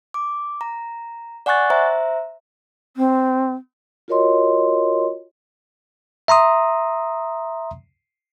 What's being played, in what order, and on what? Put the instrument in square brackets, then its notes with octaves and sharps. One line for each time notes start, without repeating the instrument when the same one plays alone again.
[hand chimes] D6
A#5
D5 F#5 G#5 C#6 F#6 A6
C5 E5 A#5
[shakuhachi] C4
[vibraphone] F4 F#4 A#4 C#5 D#5 C6
[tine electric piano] E5 A#5 C6 D#6